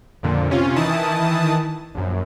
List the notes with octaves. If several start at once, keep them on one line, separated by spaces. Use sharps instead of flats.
F2 A#2 D3
C3 C#4 F4
D#3 E3 E4 A5 D#6
A#1 F#2